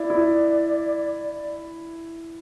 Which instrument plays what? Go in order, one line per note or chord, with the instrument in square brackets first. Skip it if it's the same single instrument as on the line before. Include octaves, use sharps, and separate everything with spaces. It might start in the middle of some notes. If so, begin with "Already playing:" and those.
Already playing: [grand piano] E4 [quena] D5
[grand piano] E4